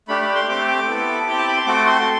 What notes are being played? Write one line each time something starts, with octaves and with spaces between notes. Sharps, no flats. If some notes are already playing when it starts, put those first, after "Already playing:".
A3 D4 G4 B5
B5
C6
A3 C4 G4 D6
D6
B3 E4 A4
C4 E4 G4 G5
A5
B5
C6
A3 C4 F#4 A4 D6
C6